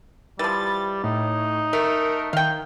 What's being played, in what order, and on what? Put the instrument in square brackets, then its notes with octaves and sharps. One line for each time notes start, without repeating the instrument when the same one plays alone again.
[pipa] E3 F3 [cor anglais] G3 [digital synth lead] A6
[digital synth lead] A2 [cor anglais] D#4
[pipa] A3 [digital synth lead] A#4
[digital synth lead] D#3 [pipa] F5 G5